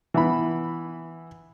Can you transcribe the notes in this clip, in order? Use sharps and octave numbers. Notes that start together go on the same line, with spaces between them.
E3 B3 B5